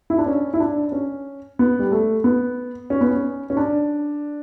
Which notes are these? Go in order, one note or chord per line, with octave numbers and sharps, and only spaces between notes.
E4
D4
C#4
E4
D4
C#4
B3
G3
A3
B3
C#4
B3
C#4
C#4
D4